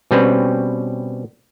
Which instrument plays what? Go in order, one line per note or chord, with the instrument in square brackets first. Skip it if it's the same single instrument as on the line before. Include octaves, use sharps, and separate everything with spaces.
[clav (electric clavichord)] B2 G3 C4 C#4 B4